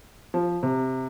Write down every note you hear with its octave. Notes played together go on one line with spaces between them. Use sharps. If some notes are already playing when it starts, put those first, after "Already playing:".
F3
C3